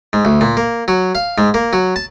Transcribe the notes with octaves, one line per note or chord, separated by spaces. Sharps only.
G#2
D2
A#2
A#3
F#3
F5
G#2
A#3
F#3
A5